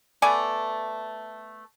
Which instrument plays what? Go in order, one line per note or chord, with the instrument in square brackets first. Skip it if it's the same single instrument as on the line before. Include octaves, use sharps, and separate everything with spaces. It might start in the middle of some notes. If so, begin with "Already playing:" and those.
[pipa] A3 B3 D5 G#5